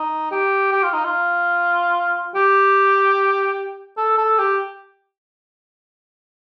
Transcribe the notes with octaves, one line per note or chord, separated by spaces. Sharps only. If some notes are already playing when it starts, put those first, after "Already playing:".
Already playing: D#4
G4
G4
F4
D#4
F4
G4
A4
A4
G4